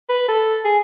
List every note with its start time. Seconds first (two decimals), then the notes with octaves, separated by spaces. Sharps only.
0.09 B4
0.28 A4
0.65 G#4